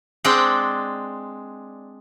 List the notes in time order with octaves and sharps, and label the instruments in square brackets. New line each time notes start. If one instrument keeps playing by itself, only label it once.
[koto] G#3 C4 D4 D5 F#5 G5